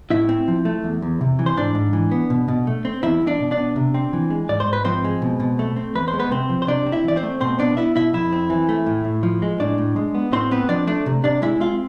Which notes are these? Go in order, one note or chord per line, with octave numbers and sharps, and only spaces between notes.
A2 E4 E5
C4
F3
A3
E2
E2
C3
E3
C5
G#2 D4 D5
G#2
E3
B3
B2
B2
A3
C4
E2 E4 E5
E2
D4 D5
B2
D4 D5
B3
C3
C4
E3
G#3
G#2 D5
C5
G#2
B4
F3 C4 C5
G#3
B2
B2
A3
C4
E2 B4
C5
G#3
B3 B4
C3 C4 C5
F3
C5
C3 D4 D5
C4
E4 E5
E3 D5
C4 C5
A3
B2 C4 C5
B3 D4 D5
B3 E4 E5
B2 E4 E5
F2 E4 E5
C4
E3
A3
A2
A2
F3
G#3
A2 D4 D5
A2
G#3
B3
A2 C4 C5
B3 C4 B4
F3 D4 D5
A3 D4 D5
C3
C3 D4 D5
G#3 E4 E5
C4 F4 F5